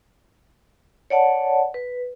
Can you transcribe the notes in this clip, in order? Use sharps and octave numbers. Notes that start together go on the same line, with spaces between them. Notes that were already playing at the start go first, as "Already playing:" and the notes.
C#5 D5 F#5 A5
B4